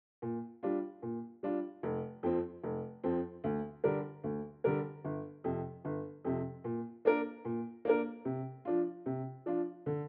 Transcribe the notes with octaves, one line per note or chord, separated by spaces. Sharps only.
A#2
G3 D4 F4
A#2
G3 D4 F4
F1
F2 F3 C4
F1
F2 F3 C4
D2
D3 G3 D4 A#4
D2
D3 G3 D4 A#4
G1
F2 C3
G1
F2 C3
A#2
A#3 D4 A#4
A#2
A#3 D4 A#4
C3
F3 D4 F4
C3
F3 D4 F4
D3